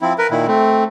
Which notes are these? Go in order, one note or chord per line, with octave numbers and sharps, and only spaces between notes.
F3 C4 E4
A#4 B4
A#2 D#3 E4
A3 C4